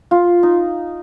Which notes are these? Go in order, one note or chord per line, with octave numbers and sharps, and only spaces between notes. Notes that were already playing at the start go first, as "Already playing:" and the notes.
F4
D#4